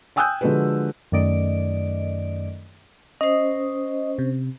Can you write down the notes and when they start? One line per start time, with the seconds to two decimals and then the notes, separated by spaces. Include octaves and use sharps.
0.16 G5 G#5 D#6 E6 F#6 G6
0.41 D3 F3 G#3 F#4 A4 B4
1.12 F#2 D#3 A3 D5 D#5 D7
3.21 C#4 C5 D#5
4.19 C3